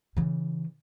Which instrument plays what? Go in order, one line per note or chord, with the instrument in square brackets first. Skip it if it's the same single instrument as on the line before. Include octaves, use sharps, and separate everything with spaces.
[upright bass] C#3 E3